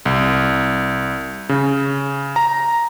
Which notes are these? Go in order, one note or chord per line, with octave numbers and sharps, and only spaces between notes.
C2
C#3
A#5